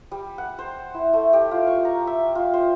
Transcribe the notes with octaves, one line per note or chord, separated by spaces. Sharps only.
G3
F#5
C5
E4
A3
G4
F4
C#6
A#5
E5
F4
C5